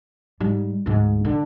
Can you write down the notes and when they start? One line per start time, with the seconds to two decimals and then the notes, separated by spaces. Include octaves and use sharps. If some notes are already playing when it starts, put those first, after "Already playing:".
0.40 G#2 G3
0.86 D2 G#2
1.25 D3